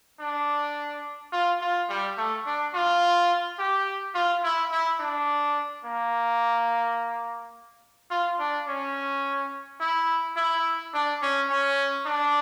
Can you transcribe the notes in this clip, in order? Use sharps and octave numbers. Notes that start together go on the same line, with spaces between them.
D4
F4
F4
G3
A3
D4
F4
G4
F4
E4
E4
D4
A#3
F4
D4
C#4
E4
E4
D4
C#4
C#4
D4